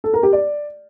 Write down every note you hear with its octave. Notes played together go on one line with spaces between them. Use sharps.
A4
A#4
G4
D5